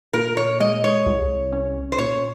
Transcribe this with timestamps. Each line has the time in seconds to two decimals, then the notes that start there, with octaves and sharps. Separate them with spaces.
0.13 A#2 A#4
0.37 C#5
0.60 G#3 D#5
0.84 C#5
1.06 C2
1.52 C#4
1.92 C5
1.98 A#2 C#5